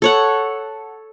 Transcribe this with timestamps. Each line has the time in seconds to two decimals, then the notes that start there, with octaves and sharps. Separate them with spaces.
0.02 A4 C#5 F#5